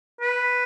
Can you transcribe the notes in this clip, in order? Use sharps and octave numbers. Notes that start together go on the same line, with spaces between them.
B4